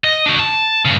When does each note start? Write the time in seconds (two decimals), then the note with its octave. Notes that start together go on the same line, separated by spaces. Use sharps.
0.04 D#5
0.26 D4 F#4
0.39 A5
0.85 G2 C#3